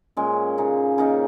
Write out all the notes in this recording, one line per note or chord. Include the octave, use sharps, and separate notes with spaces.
A#2 G#3 C#4
C#3 A#3 D#4
C#3 A#3 D#4